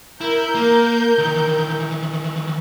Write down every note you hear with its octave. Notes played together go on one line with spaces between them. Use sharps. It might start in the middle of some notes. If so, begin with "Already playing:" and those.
E4 A#4 G6
A#3
D#3 E3